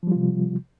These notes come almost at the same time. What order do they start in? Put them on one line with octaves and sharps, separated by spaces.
F3 G3 F4 C3